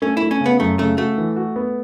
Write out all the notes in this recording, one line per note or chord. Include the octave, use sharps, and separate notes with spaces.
A3 C#4
A3 E4
C#4
C#3
B3
F#2 A3
C#3 A3
A3 F#4
E3
F#4
B3